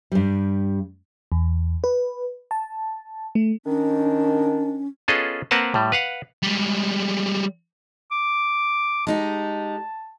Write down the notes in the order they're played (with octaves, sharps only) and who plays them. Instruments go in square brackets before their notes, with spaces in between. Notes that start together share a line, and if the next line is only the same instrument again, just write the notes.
[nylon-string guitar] G2 G3
[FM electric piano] E2
B4
A5
A3
[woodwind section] D#3 D4 [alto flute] C#4
[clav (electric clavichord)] B3 C#4 F4 G#4 A4 D#5
A#3 C4 A#4 B4 F#5 A5
A2 G3
B4 F5 F#5
[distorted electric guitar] G3 G#3
[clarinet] D6
[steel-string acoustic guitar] G#3 D#4 G4 [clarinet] A5